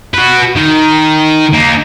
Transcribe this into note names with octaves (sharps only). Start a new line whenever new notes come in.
F#4 B4
D#3
A#3 D#4